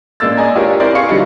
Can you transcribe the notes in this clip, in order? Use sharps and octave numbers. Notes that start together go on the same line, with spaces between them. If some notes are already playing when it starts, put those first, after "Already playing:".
A1 G#3 A#3 D4 E6 A6
D5 D#5 G#5 A#5
D4 F4 G4 G#4 A#4 C#5
C4 E4 A#4 C5 D5
G#4 F5 C#6 C#7
D3 F#3 G3 D#4 E4